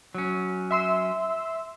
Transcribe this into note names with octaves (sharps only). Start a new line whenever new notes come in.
F#3 C#4
E5 C6 E6